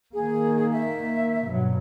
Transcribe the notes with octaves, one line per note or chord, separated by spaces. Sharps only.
D#3 A#3 G#4
E5
G2 B2 F#3